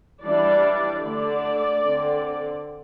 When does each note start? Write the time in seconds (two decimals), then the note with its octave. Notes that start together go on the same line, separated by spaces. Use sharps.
0.22 E3 G3 D4 D5
1.02 D3 A3 D4 D5
1.82 D3 C4